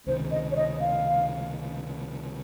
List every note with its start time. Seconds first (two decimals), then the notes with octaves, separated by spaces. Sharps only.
0.06 C#2 C3 D#3 C5
0.31 D#5
0.51 C#5
0.56 D#5
0.81 F5